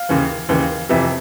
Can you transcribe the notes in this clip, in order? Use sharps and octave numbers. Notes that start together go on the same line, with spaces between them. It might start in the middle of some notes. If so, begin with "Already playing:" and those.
Already playing: F5
D#2 C#3 E3
D#2 C#3 E3
F2 C3 E3 E5